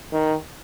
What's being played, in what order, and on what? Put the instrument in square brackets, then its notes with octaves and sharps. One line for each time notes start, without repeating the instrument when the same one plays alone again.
[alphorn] D#3